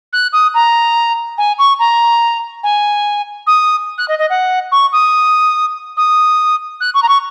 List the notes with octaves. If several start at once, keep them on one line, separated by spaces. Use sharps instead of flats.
F#6
D#6
A#5
G#5
C#6
A#5
G#5
D#6
F#6
D#5
D#5
F#5
C#6
D#6
D#6
F#6
C#6
A#5
C#6